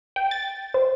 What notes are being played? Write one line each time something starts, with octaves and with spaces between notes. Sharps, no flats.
G5
A6
C5